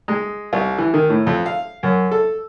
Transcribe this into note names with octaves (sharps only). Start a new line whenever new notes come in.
G#3
C2
E3
D#3
A2
F2
F5
F#2
A4